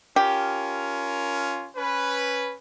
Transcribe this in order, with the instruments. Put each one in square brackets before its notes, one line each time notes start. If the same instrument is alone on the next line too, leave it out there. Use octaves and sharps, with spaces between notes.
[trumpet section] C#4 F4 A#4 [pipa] G4
[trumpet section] C#4 B4